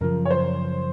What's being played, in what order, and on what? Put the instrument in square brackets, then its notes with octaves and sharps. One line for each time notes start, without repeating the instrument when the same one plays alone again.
[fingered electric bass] F#2 C#3 F3 [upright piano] A#4
[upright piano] C#5
C5